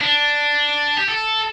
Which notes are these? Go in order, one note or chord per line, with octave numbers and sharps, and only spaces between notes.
D4
G4
A4